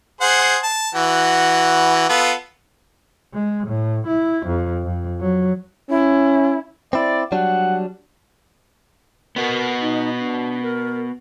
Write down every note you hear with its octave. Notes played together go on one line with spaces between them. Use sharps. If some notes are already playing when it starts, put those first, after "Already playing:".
G#4 C5 F#5
A5
E3 F#4
B3 F4 A4
G#3
A2
E4
F2
F2
F#3
C#4 E4
C4 E4 D5
F#3 G3 D4 F#5
B3 F#4 A#4
D#4
D4
A#4